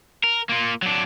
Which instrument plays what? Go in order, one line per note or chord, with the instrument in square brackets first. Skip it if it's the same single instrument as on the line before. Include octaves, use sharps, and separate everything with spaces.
[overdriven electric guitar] A#4
A#3 F4
F#3 D4